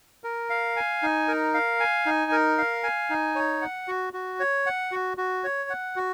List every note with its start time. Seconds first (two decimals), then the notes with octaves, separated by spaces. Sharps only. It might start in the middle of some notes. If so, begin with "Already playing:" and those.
0.24 A#4
0.50 F5
0.76 G#5
1.02 D#4
1.28 A#4
1.54 F5
1.80 G#5
2.06 D#4
2.32 A#4
2.58 F5
2.83 G#5
3.10 D#4
3.35 C#5
3.62 F#5
3.88 F#4
4.13 F#4
4.40 C#5
4.66 F#5
4.92 F#4
5.17 F#4
5.44 C#5
5.70 F#5
5.96 F#4